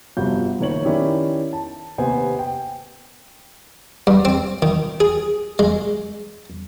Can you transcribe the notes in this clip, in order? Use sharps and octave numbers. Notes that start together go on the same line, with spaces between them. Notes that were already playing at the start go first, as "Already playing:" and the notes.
G1 C3 F3 F#4 G6
F#1 D#3 C#5 F#7
D#3 C#4 E4 G4 D5
A5
D#2 C3 B3 C5 G#5
G5
G2
C4
D#3
G#4
G#3